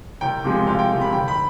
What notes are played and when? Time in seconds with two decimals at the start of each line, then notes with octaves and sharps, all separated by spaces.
0.21 C2 G5
0.44 C3 F3 G#3
0.67 C2 F5
0.79 G5
0.90 C3 F3 G#3
1.01 B5
1.12 G1 G5
1.28 B5